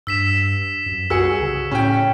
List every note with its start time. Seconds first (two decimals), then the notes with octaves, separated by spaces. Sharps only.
0.07 G2 E6 B6 E7
0.86 F#2
1.10 C2 F#4 G#4 E6 C#7
1.42 C#3
1.71 A2 C#4 G5